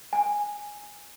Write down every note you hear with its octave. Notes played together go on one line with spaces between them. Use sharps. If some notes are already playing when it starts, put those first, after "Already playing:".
G#5